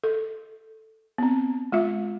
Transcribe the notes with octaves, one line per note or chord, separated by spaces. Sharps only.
A4
B3 C4
G#3 F4 E5